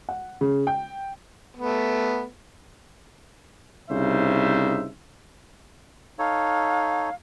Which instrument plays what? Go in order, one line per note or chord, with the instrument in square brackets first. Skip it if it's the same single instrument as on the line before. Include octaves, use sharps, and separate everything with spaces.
[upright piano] F#5
C#3
G5
[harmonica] A3 B3
[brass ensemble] C2 C#3 D#4 C5 E5
[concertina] D#4 A4 C#5 [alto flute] F5